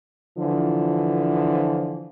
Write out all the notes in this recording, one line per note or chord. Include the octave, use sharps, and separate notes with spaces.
D3 E3 F3